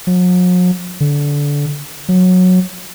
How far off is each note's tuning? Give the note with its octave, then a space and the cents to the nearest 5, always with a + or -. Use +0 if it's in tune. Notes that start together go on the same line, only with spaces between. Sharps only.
F#3 -45
D3 -20
F#3 -15